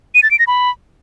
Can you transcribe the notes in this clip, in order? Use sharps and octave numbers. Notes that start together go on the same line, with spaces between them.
D#7
A6
D7
A#6
B5